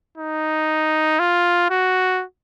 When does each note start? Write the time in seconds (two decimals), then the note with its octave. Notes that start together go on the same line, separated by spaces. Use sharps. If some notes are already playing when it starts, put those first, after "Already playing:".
0.18 D#4
1.19 F4
1.70 F#4